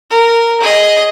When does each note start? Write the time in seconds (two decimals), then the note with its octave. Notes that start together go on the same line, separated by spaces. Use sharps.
0.10 A#4
0.61 G#4 D#5